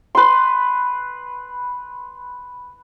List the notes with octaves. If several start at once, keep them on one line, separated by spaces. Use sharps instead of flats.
B4 C6